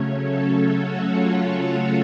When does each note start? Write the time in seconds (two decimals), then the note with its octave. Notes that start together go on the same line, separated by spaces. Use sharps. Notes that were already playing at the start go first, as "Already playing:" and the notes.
Already playing: C#3 F#3 A3 C#4 C#5
0.26 A4
0.84 F#4
1.12 F4